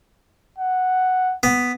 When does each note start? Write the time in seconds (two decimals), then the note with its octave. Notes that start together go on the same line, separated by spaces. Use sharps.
0.58 F#5
1.43 B3